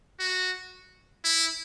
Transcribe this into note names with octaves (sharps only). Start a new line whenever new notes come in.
F#4
E4